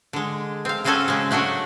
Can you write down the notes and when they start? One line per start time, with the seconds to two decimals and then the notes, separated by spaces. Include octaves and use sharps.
0.13 D3 G#3
0.65 C4 F5
0.84 C#3 C4 C#4 F#4 A4 G#5
1.08 C#3 G#3
1.31 F#3 A3 D4 F#4 C#5